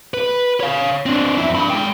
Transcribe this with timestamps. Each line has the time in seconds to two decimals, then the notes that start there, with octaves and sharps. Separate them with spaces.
0.14 B4
0.60 C#5 F5
1.06 C4 D4
1.38 F2 E4
1.55 D4 B5
1.70 G#3 G5